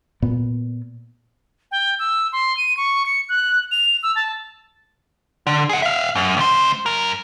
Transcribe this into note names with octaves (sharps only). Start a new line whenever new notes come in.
A#2 B3
G5
E6
C6
D#7
C#6
C#7
F#6
F7
E6
A5
D3
G#4 F#5
E5 F5
F#2
C#2 C5
F#2 A#4